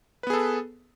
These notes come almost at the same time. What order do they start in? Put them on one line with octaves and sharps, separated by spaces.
B4 B3 G#4 A4